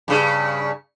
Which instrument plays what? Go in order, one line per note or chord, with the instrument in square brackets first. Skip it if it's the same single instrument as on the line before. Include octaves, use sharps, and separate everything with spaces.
[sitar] G2 C#3